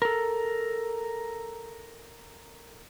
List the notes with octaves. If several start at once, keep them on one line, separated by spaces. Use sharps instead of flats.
A4 A#4